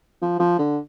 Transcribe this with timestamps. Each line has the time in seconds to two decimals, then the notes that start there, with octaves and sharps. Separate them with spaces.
0.22 F3
0.40 F3
0.59 D3